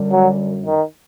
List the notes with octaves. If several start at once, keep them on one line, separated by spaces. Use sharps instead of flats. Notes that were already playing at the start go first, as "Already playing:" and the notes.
Already playing: F#2 D3 G3 D4
F#3
D#3